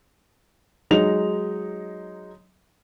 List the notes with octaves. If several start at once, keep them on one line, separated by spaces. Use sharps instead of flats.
F#3 G#3 D#4 F7